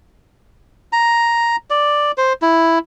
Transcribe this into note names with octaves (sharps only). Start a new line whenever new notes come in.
A#5
D5
C5
E4